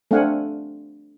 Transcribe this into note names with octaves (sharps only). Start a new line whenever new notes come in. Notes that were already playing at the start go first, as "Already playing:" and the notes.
A3 C4 D4 F5 F#5 G#5